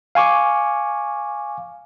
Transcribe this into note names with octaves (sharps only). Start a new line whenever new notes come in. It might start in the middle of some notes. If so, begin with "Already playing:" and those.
F5 G#5 C#6 D6